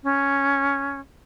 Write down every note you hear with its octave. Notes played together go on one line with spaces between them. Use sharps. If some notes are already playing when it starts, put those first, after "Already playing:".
C#4